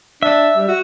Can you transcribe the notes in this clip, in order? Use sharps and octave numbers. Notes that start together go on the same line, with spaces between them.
D4 E5
G3
F#4